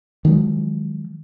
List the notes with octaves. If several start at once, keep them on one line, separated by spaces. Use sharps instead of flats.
D#3 F3 F#3 G#3